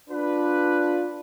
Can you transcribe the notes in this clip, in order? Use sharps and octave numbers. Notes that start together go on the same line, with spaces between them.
D4 F4 B4